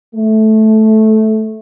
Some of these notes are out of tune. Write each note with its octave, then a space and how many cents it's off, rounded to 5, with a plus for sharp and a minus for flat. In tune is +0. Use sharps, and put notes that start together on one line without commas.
A3 -10